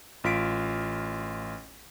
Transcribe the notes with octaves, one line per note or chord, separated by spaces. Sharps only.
A1 F4 B6 D7